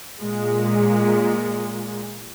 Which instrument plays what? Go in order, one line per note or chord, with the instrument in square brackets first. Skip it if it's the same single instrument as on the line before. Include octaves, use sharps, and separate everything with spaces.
[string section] A#2 G#3